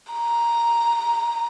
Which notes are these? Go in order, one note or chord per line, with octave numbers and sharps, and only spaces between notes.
A#5